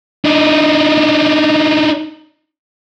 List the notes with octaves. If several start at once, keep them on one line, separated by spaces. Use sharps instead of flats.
D4 D#4